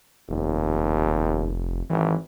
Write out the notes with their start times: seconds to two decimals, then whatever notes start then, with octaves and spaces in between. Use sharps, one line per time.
0.29 F1 D#2
1.90 G#1 E3